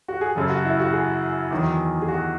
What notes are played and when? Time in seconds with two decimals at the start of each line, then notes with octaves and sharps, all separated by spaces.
0.08 F#4
0.21 G#4
0.35 F#2 C#3 F#3 A4
0.50 F#4
0.65 E4
0.80 F#4
0.93 G#4
1.51 E2 D#3 F#3
2.02 G#4
2.08 F#4